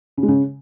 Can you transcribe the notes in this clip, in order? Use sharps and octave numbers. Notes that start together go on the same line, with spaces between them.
C#3
G#3
C#3